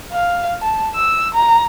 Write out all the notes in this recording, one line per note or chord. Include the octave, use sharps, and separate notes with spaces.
F5
A5
E6
A#5